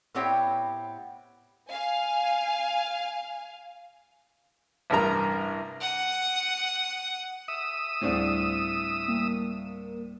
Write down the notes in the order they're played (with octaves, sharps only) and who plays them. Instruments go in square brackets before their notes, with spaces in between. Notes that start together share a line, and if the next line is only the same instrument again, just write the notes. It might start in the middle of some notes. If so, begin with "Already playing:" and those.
[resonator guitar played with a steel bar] A2 B3 C4 G4 C#5 G5
[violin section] F5 G#5
[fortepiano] A1 G2 C3 A#4 A#5
[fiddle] F#5 D#6
[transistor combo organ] E5 D#6
[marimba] D2 G3 G#4 [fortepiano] A2 C4 D4
[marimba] G3 A3 [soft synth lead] A#3